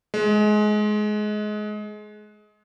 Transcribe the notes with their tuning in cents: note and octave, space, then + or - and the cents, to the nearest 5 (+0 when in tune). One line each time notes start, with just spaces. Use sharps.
G#3 +25